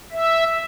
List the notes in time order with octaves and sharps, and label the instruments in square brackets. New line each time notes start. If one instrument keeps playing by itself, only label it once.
[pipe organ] E5